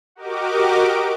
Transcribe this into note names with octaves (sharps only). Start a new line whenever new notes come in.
F#4 G4 A#4 D#5 D6